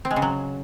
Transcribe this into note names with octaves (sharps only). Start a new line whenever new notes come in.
C4
G#3
C#3
F#3